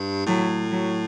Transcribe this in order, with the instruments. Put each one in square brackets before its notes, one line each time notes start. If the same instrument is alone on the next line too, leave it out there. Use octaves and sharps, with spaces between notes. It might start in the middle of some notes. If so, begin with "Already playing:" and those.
Already playing: [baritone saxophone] G2
[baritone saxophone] A2 [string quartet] F#3
[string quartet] F#3